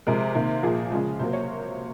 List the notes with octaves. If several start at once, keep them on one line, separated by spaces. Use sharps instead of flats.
C3 F3 G#3 A#4
C3 D#3 A#3
A#2 F3 A#3 G#4
C#3 F3 G#3
C3 F#3 A#3 C5
C#5